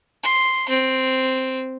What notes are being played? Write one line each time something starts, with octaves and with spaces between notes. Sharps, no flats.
C6
C4